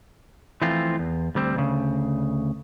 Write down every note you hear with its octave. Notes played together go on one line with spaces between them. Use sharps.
E3 F3 A3 C4 F4
E2
D2 G3 C4
D2 C#3